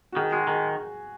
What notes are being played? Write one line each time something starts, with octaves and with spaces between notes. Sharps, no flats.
F#4
D#3 G#4
G#3 F#4
D#3 G#4